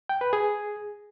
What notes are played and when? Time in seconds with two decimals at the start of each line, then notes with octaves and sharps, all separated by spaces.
0.09 G5
0.21 B4
0.33 G#4